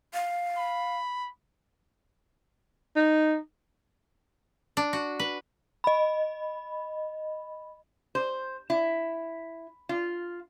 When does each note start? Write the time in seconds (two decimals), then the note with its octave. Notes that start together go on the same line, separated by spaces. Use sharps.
0.14 F5
0.57 B5
2.96 D#4
4.77 D4
4.93 F#4
5.20 B4
5.84 D#5 B5
8.15 C5
8.70 E4
9.89 F4